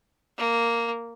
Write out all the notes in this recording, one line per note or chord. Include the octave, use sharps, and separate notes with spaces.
A#3